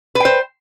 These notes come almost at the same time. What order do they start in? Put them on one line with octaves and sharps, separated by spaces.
B4 G5 C5